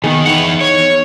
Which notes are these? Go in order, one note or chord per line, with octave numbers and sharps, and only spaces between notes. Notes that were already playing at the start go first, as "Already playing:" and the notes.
D#3 B3 D#4 G#4
E3 F#5
C#5